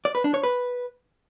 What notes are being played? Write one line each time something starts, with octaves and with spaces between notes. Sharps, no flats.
D5
B4
D4
C#5
B4